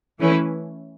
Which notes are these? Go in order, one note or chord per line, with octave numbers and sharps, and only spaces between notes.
E3 A3 C#4 E4 B4